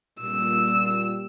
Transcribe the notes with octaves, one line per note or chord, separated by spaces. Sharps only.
A#2 G3 E6